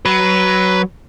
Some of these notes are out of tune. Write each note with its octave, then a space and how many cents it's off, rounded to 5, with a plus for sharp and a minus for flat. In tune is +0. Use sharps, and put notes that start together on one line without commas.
F#3 +15 B4 +0